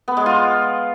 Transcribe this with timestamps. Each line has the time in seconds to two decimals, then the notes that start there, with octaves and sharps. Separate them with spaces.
0.08 B3
0.17 G#3
0.26 F4